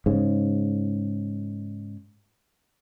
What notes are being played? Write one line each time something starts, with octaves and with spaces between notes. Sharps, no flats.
G#2 C#3